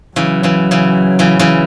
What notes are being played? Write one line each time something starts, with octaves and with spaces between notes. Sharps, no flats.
C#3 E3 F#3
C#3 E3
C#3 E3
C#3 E3
C#3 E3